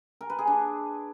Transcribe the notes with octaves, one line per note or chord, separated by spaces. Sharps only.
A#4
B4
G#4
D4